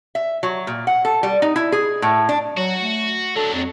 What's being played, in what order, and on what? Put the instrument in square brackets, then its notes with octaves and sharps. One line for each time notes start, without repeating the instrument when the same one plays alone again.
[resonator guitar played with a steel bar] E5
F#3
A#2
F#5
A4
G3
D#4
E4
G#4
A2
D4
[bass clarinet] F#3 [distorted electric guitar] F#4
[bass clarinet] A3
[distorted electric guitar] F#3 D4 [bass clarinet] A4
[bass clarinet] F2